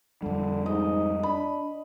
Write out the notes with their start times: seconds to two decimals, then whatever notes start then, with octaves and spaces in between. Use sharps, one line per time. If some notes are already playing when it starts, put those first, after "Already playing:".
0.22 F2 D3 G3
0.66 G#2 D#5
1.23 D4 B5